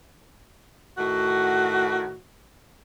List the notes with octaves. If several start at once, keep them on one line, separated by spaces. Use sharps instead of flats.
A2 D#3 F#4